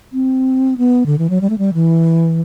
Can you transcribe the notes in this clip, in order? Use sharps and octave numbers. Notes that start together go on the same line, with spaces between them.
C4
B3
D3
E3
F#3
G3
A3
G3
E3